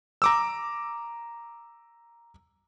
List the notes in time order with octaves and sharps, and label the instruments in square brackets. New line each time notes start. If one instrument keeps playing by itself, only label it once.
[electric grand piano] A#5 D6 E6